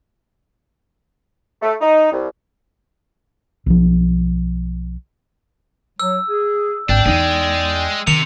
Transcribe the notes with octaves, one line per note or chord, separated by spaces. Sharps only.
A3
D#4
C2
B1 F3
F#3 E6
G#4
G#1 D4 D5 G5
E2 G#3 D#4 G#4
C3 D#3 C#7 F7